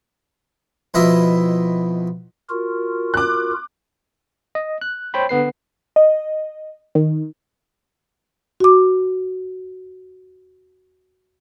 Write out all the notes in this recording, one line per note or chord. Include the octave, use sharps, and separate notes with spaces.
F2 B2 E4 F4 D#5 E5
F4 F#4 A#4
D6 F#6
D#5
F#6
C5 C#5 G5 B5
D3 B3 B4 C7
D#5
D#3
F#4 D6